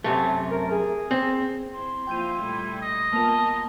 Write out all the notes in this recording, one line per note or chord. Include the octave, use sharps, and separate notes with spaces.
F#2 C3 A3 C4
A#4
G#4
C4
C4 E4 C6
F3 A#3 E4 F4 G5 G6 D#7
A#2 G3 A3
D#5
A#3 B3 F4 A#4 A5